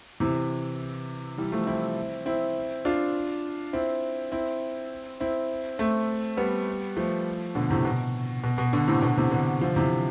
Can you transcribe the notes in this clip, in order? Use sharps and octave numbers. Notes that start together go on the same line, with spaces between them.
C3 E3
E3 G3
F3 A3
C4 E4
C4 E4
D4 F4
C4 E4
C4 E4
C4 E4
A3 C4
G3 B3
F3 A3
B2 D3
A2 C3
B2
B2
B2
B2 D3
A2 C3
B2 D3
C3 E3
B2 D3
D3 F3
C3 E3